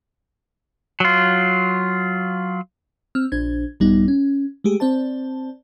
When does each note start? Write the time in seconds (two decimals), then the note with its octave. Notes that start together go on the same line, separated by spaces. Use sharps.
1.00 F#3 F4
3.15 C4 E6 F6
3.32 A#1 D4 C5 G#6
3.80 A#1 G2 G3 B3 D#4
4.08 C#4
4.64 G#3 A3 G4 G#4
4.80 C4 C5 D5 A5